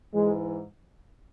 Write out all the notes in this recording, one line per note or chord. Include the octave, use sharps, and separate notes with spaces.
G#2 E3 G#3